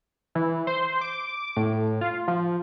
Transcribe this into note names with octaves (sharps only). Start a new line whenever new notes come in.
E3
C5
D6
A2
F4
F3